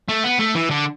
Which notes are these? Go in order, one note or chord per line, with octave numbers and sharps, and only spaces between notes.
A3
B3
A3
E3
D3